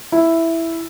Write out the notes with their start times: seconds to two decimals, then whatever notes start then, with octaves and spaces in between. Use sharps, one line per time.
0.12 E4